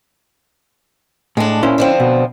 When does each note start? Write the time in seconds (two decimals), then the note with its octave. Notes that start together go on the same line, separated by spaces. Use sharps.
1.37 A2 G#3 D4
1.63 A#2 C#4 E4 C5
1.78 D3 F3 C4
2.00 B2